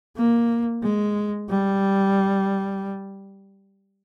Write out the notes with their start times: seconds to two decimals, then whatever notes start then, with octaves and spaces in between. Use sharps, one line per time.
0.17 A#3
0.83 G#3
1.50 G3